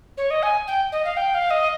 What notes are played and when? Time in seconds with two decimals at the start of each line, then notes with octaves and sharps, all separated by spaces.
0.17 C#5
0.30 D#5
0.43 G#5
0.67 G5
0.92 D#5
1.05 F5
1.17 G5
1.34 F5
1.50 D#5